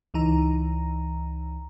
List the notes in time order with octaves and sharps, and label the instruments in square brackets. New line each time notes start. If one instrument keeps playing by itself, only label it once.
[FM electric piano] C#2 E3 D#4 A#5